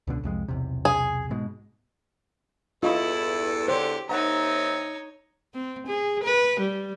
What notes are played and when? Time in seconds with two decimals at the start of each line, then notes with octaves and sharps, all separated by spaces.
0.07 C#2 B2 D3
0.23 C2 F2 G#3
0.48 B1 E2 C3
0.85 G#4
1.30 G#2 B2 G#3
2.83 E2 G2 E4 F4 A4 D#5 C#6
3.68 E2 D3 G4 C5 C#5
4.09 D#2 C4 D#4 C#5 E5 F#5 A#5
5.54 C4
5.87 G#4
6.24 B4
6.60 G3